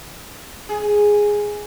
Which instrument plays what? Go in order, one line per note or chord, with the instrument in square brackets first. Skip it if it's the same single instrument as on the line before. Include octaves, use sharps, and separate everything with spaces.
[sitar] G#4